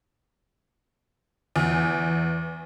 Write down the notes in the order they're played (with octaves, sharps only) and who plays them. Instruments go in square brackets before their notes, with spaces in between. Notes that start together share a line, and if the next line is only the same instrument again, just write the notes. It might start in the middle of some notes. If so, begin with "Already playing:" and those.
[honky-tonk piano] E2